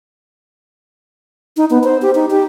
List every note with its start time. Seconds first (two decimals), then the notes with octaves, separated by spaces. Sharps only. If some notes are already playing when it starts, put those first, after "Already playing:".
1.57 D#4
1.70 B3
1.84 C5
2.02 G4
2.15 D#4
2.30 G4